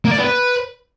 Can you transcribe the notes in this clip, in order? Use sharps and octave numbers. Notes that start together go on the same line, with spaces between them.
A#3
D5
B3
B4